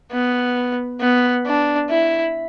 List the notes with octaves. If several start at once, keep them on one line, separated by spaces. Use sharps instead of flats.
B3
B3
D4
E4